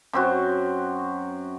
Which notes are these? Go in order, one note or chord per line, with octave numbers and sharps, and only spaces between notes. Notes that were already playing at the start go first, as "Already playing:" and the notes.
F#2 C4 F#4